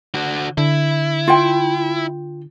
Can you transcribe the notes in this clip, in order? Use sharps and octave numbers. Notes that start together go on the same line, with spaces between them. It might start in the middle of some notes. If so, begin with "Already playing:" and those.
D3 F#4
D3 E4
F4 G5